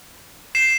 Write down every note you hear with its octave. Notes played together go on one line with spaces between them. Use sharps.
C7 E7